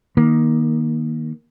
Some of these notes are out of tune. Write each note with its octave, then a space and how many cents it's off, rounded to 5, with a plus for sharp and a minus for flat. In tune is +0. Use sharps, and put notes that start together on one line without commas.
D#3 +0 A#3 +15